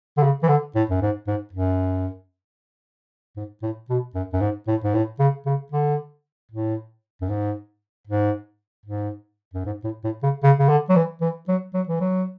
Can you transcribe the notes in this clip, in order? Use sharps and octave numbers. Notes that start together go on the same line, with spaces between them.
D3
C#3
E3
D3
A2
F#2
G#2
G#2
F#2
G#2
A2
B2
F#2
F#2
G#2
A2
G#2
A2
C#3
C#3
D3
A2
F#2
G#2
G#2
G#2
F#2
G#2
A2
A2
C#3
C#3
C#3
D3
F#3
E3
E3
F#3
F#3
E3
F#3